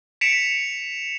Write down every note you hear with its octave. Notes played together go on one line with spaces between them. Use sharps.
B6 C#7 D7 E7 F7